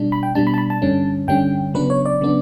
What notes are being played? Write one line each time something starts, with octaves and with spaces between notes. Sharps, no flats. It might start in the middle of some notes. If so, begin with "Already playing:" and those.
Already playing: B2 G3 D4
B5
G5
B2 G3 D4 A5
B5
A5
B5
A5
G2 D3 G3 C#4
G2 D3 G3 C#4 G5
C#3 F#3 B3 D4 B4
C#5
D5
C#3 F#3 B3 D4